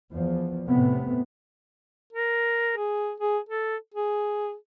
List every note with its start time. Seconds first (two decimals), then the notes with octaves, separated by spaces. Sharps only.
0.12 E2 F3
0.69 A2 C3 B3
2.13 A#4
2.77 G#4
3.20 G#4
3.49 A4
3.94 G#4